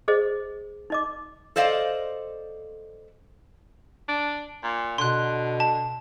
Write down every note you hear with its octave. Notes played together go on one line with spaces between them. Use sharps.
G#4 C5 D#5
D#4 D#5 D6
A4 C5 D5 D#5 F5
D4
A#2
B2 D3 C6 F#6
A5